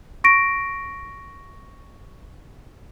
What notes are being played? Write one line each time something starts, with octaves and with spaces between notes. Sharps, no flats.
C#6 A#6 D7